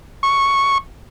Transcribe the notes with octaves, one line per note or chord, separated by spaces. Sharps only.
C#6